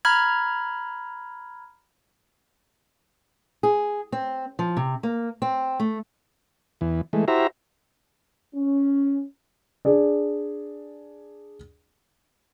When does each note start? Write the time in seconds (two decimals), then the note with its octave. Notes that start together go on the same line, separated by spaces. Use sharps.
0.05 A#5 B5 F6 G#6
3.63 G#4
4.12 C4
4.59 F3
4.77 C3
5.03 A#3
5.42 C4
5.80 A3
6.81 E2 E3
7.13 E3 G#3 A3
7.28 E4 F#4 G4 C5 E5 A#5
8.54 C#4
9.85 D4 G#4 D5